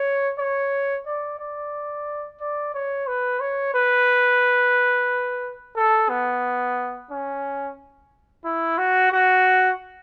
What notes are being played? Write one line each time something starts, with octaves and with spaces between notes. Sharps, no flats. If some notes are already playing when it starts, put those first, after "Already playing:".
Already playing: C#5
C#5
D5
D5
D5
C#5
B4
C#5
B4
A4
B3
C#4
E4
F#4
F#4